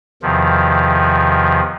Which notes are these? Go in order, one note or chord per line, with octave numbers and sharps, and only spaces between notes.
E2 C3 D#3 F3